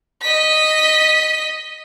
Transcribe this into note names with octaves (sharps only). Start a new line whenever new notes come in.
D#5 B6